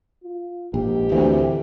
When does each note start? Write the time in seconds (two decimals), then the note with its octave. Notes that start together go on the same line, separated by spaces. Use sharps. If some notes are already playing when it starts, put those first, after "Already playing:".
0.24 F4
0.74 A#1 G#2 G4
1.12 D2 E3 C4